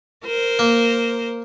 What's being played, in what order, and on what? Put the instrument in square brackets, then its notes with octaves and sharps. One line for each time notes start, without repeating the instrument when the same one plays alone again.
[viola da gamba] A#4 C5
[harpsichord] A#3